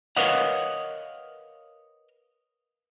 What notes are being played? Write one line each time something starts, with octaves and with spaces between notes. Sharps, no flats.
A#4 B4 C#5 D#5 F5 F#5